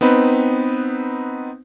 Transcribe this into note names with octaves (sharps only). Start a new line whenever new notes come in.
B3 C4 D#4 B4